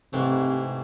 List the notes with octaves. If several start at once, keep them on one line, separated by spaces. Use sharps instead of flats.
G#2 C3 E3 A3 C4